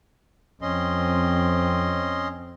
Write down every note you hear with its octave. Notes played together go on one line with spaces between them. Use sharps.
F2 C4 C#4 D#5 C6